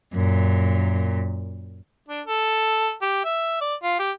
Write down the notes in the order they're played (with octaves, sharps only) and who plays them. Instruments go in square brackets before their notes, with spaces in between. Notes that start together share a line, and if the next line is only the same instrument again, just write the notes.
[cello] F#2 A#2
[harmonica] D4
A4
G4
E5
D5
F4
G4